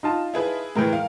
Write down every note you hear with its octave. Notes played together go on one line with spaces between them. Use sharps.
D#4 F4 A5
E4 G#4 B4
A2 E3 G#3 A#4 G5
F5